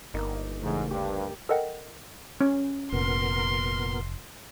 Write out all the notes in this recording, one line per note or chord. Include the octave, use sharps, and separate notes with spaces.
G1 A#3 D#4
E2 G#2 C#3 A3
D2 G2 G4
A4 A#4 D#5 F#5 G5
C#4
F1 A#2 B3 A#4 C6